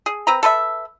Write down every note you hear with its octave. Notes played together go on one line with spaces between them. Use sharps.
G#4
C4 B4 A#5
A4 B4 C5 E5